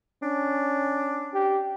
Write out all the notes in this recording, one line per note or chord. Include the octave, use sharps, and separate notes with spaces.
C#4 D4
G4